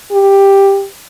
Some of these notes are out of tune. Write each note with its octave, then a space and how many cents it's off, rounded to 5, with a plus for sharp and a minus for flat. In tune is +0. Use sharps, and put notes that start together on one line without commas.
G4 +5